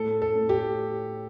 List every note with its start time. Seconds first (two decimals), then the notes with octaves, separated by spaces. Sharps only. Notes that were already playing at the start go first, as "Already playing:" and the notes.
Already playing: A2 A4
0.22 A4
0.35 A2
0.49 G4